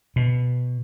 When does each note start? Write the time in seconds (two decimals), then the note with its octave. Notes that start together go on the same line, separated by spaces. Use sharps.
0.16 B2